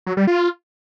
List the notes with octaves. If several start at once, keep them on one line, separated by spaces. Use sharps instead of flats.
F#3
G3
F4